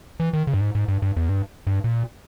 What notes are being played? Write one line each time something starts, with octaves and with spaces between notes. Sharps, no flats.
E3
D#3
C#3
G2
G#2
G#2
G2
G2
E2
G2
G2
A#2